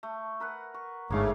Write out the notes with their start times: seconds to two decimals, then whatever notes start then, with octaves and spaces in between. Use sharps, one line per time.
0.03 A3
0.40 A#4 B4 F#5
0.74 C#6
1.10 G1 G#2 C#3 A3 A#3 C#5 F5